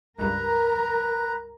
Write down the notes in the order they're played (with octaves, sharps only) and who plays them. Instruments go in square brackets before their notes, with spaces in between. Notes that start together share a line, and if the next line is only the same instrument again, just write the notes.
[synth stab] C#2 G2 [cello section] A#4 [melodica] B4 A#5